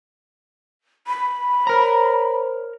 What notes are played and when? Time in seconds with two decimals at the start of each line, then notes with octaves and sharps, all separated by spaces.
1.07 B5
1.67 A#4 C5 C#5 A#5